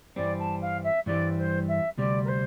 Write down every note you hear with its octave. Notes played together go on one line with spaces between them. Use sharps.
G2 E3 G3 C4 D5
A5
F5
E5
G2 E3 G3 C4 D5
C5
E5
D2 C3 G3 D5
A#4
C5